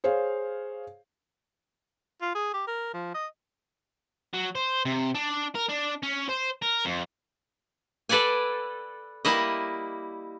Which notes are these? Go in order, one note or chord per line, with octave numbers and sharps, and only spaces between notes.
G#4 C5 C#5 F5
F4
G#4
G4
A#4
F3
D#5
F#3
C5
C3
D4
A#4
D4
C#4
C5
A#4
F2
A4 B4 D5 F#5 G#5
G3 A#3 E4 D#5